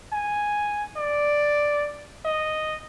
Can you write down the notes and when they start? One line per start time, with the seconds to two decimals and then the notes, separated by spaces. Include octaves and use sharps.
0.13 G#5
0.97 D5
2.25 D#5